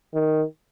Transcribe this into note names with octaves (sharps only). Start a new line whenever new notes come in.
D#3